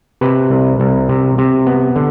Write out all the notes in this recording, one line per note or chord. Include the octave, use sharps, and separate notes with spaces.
C3 B4
C2
C2
C3
C3
B3
D3